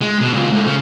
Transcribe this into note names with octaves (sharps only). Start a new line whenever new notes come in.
G#3
B2
C#2 A#2
G#2 A3
C#3